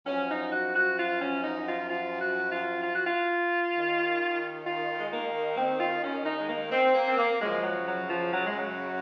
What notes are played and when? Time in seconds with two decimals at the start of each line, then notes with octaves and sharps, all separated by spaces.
0.07 F#2 F3 C#4
0.30 D#4
0.53 F#4
0.75 F#4
0.98 F4
1.21 C#4
1.44 D#4
1.67 F4
1.89 F4
2.21 F#4
2.51 F4
2.82 F4
2.94 F#4
3.07 F4
3.73 D#2 D#3
4.65 F4
4.99 G#3
5.11 A#3
5.57 C4
5.80 F4
6.03 C#4
6.26 D#4
6.39 G#3
6.49 A#3
6.71 C4
6.95 A#3
7.08 C4
7.17 A#3
7.40 F#2 C#3 F3 G#3
7.63 F#3
7.86 F#3
8.09 F3
8.32 F#3
8.45 G#3
8.58 F#3